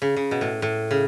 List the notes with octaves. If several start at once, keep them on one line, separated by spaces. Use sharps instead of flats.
C#3
C#3
B2
A2
A2
C#3